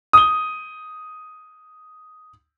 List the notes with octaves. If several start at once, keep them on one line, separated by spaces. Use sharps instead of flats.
D#6 G7